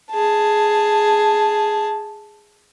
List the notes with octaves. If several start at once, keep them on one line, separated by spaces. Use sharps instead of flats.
G#4 A5